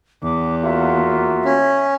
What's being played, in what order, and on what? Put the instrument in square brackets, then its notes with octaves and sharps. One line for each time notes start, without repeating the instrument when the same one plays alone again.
[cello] E2 [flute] D6
[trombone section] A#3 F4 F#4 [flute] E5
[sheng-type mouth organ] C#4